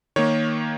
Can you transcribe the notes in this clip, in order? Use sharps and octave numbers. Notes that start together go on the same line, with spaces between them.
D#3 A#3 C#5